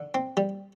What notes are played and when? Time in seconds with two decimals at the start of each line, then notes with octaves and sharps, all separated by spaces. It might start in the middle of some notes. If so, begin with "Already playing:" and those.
Already playing: D3
0.14 C4
0.37 G3